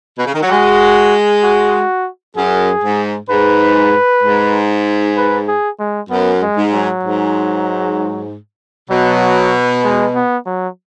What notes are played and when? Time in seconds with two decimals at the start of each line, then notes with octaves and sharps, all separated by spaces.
0.19 B2
0.26 C#3
0.34 D#3
0.42 F#3
0.50 G#3 F#4
1.44 F#4
2.36 F#2 G#4
2.84 G#2
3.30 G#2 B4
4.23 G#2
5.17 B4
5.48 G#4
5.79 G#3
6.10 F#2 B3
6.42 G#3
6.57 G#2
6.73 F#3
7.04 G#2
8.90 B2 F#3
9.84 G#3
10.15 B3
10.46 F#3